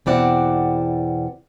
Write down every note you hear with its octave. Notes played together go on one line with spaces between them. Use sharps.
E2 B2 C4 E4 D5 F#5